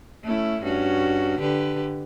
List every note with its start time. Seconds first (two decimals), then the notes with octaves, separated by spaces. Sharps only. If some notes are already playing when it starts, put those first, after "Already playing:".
0.24 A3 C#4 E4
0.63 G2 C#4 F#4
1.40 D3 G4 B4